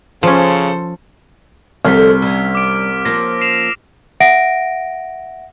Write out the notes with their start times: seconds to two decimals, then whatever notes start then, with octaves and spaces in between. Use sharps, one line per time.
0.23 C#3 F3 C#4 A4 C5
1.85 C2 D3 F3 A4 F6 B6
2.22 G3 C#4 E6
2.55 D6 D7
3.05 F3 A#3 C#4 A#6
3.41 C7 E7 F7
4.20 E5 F#5 A#6 D7